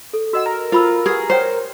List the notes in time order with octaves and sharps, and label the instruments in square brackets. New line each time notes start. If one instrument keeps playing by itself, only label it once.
[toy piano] A4
[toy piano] F#4 D#5 F#5 [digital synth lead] E6
[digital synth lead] A#4
[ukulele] F4 [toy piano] C5 B5 E6
[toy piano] G4 B4 F#5 [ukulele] G#4
[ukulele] C5 [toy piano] C#5 F#5 G5